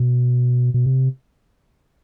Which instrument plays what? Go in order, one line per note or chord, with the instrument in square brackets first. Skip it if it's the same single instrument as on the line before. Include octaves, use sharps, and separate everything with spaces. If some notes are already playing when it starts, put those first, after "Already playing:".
Already playing: [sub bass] B2
B2
C3